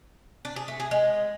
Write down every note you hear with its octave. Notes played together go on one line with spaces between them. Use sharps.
D4
G#4
A3
G#4
G#3